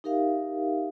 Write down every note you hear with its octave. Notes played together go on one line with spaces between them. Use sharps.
D#4 G4 A#4 E5 F5